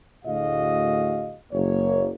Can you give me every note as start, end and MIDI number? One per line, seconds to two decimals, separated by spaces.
0.25 1.36 38
0.25 1.36 45
0.25 1.36 66
0.25 1.36 68
0.25 1.36 75
0.25 1.36 77
1.52 2.11 30
1.52 2.11 58
1.52 2.11 73